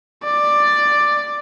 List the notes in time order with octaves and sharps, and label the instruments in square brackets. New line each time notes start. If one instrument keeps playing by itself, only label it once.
[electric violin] D5